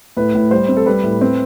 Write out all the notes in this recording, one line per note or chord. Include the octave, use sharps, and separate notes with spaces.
A2 B4
A2
G3 C5
C4
A4
G3 B4
A2
C4 B4